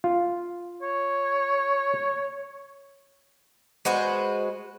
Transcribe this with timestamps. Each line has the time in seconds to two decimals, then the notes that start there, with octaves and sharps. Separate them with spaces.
0.04 F4
0.82 C#5
3.85 G#3 F#4 B4 C5